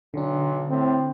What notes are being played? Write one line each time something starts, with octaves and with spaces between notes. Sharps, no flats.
B1 D3 D4
A2 C4